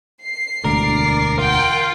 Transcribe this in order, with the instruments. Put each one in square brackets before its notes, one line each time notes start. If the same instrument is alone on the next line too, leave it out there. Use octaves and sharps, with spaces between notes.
[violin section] C7
[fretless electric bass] E1 D2 D3 [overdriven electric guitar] A#4 [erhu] D5
[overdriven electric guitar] F4 [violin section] A#4 F#5 [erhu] G5